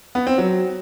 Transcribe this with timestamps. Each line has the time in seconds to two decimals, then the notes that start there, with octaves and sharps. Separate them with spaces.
0.15 B3
0.27 C4
0.38 F#3